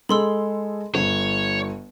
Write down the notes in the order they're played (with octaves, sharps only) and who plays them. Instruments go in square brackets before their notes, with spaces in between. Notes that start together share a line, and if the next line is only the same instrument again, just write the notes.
[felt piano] G#3 G#4 A4 [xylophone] B5 C6 E6
[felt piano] G1 [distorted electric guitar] C#5